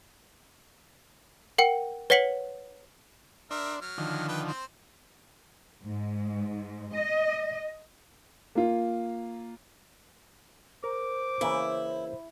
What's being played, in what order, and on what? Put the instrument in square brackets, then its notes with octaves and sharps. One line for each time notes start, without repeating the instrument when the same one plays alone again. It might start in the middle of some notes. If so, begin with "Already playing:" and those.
[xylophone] A#4 F#5 G5 C#7
B4 C#5 F#5 B6 C#7 F#7
[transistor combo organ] D4 C6 [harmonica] A#4 E5
[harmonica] F#3 F6
[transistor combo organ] D3 D#3 F3
[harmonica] B4 G5
C4 C5
[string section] G#2
D#5
[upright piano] A#3 F4
[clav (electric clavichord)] A#4 [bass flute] C5 [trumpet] D6
[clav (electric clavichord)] C#3 E3 A#3 [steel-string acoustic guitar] E4